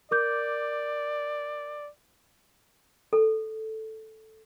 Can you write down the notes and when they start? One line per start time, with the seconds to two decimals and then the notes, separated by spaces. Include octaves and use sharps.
0.11 A#4 D5 D6 G6
3.13 A4